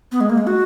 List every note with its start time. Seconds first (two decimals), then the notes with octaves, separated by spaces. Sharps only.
0.12 B3
0.20 G#3
0.30 A#3
0.38 G#3
0.47 F#4